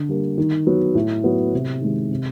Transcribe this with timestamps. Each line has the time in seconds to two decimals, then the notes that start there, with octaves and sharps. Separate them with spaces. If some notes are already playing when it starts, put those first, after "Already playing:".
Already playing: D3
0.09 G3 A#3
0.38 D#3
0.67 F#3 B3
0.95 A2
1.24 F#3 B3
1.54 C3
1.81 D#3 G#3
2.11 C3